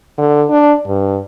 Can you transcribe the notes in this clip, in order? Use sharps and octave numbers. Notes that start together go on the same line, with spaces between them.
D3
D4
G2